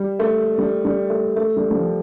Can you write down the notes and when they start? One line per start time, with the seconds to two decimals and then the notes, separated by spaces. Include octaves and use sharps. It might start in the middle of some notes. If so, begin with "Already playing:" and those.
Already playing: G3
0.19 A3
0.58 G3
0.85 G3
1.10 A3
1.36 A3
1.56 G3
1.70 G3
1.75 F3